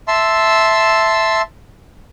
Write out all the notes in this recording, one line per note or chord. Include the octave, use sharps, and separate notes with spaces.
E5 A5 C6 E6